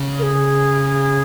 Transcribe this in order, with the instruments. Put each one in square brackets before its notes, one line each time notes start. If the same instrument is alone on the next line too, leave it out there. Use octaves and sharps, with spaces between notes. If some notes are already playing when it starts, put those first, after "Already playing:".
Already playing: [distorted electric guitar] C#3
[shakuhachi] A#4
G#4